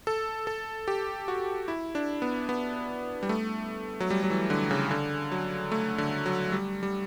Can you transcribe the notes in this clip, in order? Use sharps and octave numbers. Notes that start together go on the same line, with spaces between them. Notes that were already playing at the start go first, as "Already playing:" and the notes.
A4
A4
G4
F#4
E4
D4
B3
B3
G3
A3
F#3
G3
F#3
E3
D3
C#3
D3
F#3
A3
D3
F#3
G3
G3